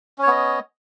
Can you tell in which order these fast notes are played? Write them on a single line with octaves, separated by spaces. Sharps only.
C#4 C#5 B3 D#5